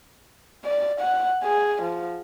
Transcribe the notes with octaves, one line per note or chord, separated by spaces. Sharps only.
D5
F#5
G#4
F3